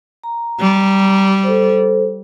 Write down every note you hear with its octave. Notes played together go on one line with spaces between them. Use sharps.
A#5
G3
A4 C5